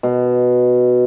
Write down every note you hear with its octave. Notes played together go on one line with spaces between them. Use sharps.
B2